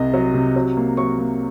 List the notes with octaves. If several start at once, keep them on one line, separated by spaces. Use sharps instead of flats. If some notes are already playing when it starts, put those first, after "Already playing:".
Already playing: C2 C3 D#5
F#3
C3
F#3
A#3
F#3 C#6
A#3